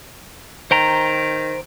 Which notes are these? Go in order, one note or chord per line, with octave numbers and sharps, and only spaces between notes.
D#3 C5 G5 A#5